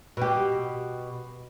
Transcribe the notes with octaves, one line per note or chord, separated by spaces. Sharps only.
B2 G4